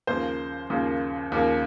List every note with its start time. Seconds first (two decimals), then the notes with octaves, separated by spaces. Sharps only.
0.07 D#2 C#3 F3 A#3 C5
0.70 D#2 C#3 F3 A#3
1.32 D#2 C#3 F3 A#3